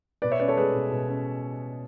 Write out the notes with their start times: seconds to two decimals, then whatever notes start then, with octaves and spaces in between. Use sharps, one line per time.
0.22 B2 B4 D5
0.31 C#5 E5
0.40 C#4 B4 D5
0.48 A4 C#5
0.57 G#3 G#4 B4
0.74 B2
0.91 B2
1.09 C#4